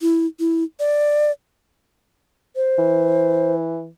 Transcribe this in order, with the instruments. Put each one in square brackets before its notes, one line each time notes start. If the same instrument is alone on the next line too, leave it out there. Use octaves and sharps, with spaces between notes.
[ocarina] E4
E4
D5
C5
[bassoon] E3